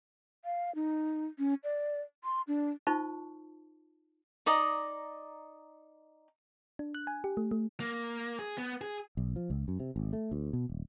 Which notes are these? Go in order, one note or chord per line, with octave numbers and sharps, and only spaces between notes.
F5
D#4
C#4
D5
C6
D4
D#4 F4 C5 A5 C#6
D#4 D5 D#5 A#5
D4
F#6
G#5
G4
A3
A3
A#3
G#4
B3
G#4
B1
F3
C#2
F#2
C3
G#1
A3
D2
B2
D#1